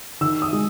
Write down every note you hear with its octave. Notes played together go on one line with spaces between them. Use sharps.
D#3 E6
D#6
G#3